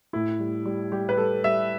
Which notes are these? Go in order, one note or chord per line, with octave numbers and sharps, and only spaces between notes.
A2 E4
G3
G3
G3 G4
B4
G3 A4
G3 E5